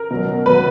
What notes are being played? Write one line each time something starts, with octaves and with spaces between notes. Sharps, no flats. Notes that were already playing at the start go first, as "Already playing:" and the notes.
Already playing: A#4
B2 F#3
B2 F#3 B4